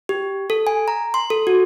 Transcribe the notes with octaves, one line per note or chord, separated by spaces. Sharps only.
G4
A4
G#5
A#5
C6
A4
F#4